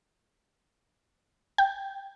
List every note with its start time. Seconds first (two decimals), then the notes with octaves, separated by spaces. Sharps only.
1.58 G5